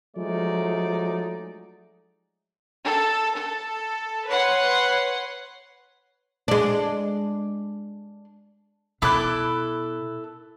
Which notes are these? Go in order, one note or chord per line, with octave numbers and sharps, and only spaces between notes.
F3 F#3 G#3 A3 D#4 D5
A4
A4
B4 C#5 F#5 C6
G#3 D4
B2 E4 A4 B5 D6 F#6